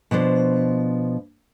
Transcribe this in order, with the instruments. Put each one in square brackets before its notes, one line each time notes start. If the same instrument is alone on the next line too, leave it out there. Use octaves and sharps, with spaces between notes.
[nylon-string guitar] B2 F3 D4 C5